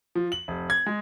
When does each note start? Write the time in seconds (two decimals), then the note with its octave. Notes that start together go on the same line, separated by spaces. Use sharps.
0.15 F3
0.32 F#7
0.48 F1
0.70 G#6
0.86 G#3